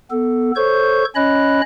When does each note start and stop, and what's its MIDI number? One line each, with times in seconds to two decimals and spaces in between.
0.11 0.52 59
0.11 0.52 69
0.56 1.05 69
0.56 1.05 72
0.56 1.05 73
0.56 1.05 85
0.56 1.05 91
1.15 1.61 61
1.15 1.61 73
1.15 1.61 75
1.15 1.61 83
1.15 1.61 90